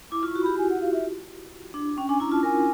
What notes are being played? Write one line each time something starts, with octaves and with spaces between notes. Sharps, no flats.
E4 D6
F4
C#6
F#4
G4 B5
G#5
F#5
F5
E5
D4
C#4 G5
D4 G#5
E4 A#5
F4 A5
A#4 G#5